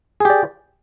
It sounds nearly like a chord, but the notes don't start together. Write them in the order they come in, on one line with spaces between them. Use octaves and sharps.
G#4 G4 D5